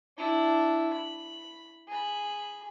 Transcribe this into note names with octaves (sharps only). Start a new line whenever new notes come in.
D4 E4
B5
G#4 B5